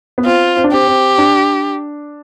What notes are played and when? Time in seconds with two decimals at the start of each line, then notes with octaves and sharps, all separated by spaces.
0.18 B3
0.25 C4 F4
0.57 C4
0.64 D4
0.72 C4 G4
0.87 C4
1.18 D4